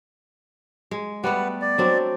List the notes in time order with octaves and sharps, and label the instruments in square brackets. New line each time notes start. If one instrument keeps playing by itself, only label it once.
[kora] G#3
[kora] G3 A3 B3 [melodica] B4 F#5
[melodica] D5
[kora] F#3 C4 D4